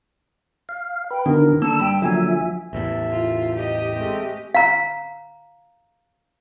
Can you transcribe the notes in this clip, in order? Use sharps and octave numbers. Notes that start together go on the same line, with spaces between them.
F5
B4 G5
B2 D3 D#3 A#4
D3 A#3 A5 E6
G2 G5 B5
D3 F3 F#3 A#3 E5 G#5
A1 E2 A2 E5
F4
G4 D#5
G#3 A3 C4
F5 A#5